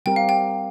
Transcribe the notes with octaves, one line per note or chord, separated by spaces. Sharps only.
G3 C4 G4 A#4 G5
F5
G5